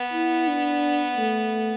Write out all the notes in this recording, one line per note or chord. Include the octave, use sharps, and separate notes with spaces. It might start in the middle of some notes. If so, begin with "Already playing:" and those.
Already playing: B3
E4
D4
A3